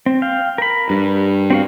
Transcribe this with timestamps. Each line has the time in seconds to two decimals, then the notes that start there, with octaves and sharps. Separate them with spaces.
0.06 C4
0.22 F5 G5
0.58 A#4 B5
0.90 G2
1.50 C4 F#4 F5